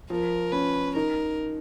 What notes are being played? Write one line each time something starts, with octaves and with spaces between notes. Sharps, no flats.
F3 A#4
C#4 B4
D#4 A#4